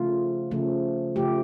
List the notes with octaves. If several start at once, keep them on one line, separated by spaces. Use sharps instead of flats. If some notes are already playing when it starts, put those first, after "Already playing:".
Already playing: C#3 F3 A3 F4
C#3 F3 A3
C#3 F3 A3 G4